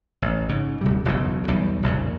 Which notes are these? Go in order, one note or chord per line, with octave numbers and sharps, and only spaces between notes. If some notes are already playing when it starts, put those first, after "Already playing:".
A1
G#2 C#3
D1 C3 G3
E1 B1 F#2 C#3
B1 E2 F#3 G3
F1 A#1 G2 C#3